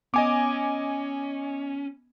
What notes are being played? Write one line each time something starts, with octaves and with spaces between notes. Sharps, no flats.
B3 C#4 D#5 G#5 D6